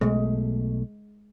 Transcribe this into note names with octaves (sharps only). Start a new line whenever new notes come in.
B1 B2 G#3 A3